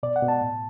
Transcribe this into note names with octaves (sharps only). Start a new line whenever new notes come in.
B2 D5
F#5
B2
A5
A2